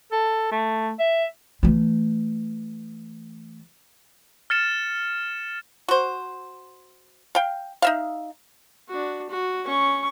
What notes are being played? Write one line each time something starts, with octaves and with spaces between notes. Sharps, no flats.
A4
A3
E5
E3 A3
F6 A6 C#7 E7
F#4 C5
F5 G5
D#4 E5 F5
D4 F#4
F#4
C#4 C#6